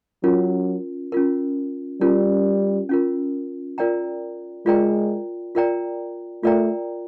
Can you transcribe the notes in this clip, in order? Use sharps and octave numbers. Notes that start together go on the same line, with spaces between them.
F#3 C#4 F4 A#4
C#4 F4 A#4
G3 C#4 F4 A#4
C#4 F4 A#4
F4 A#4 D5 G5 A#5
G#3 F4 A#4 D5 G5 A#5
F4 A#4 D5 G5 A#5
A3 F4 A#4 D5 G5 A#5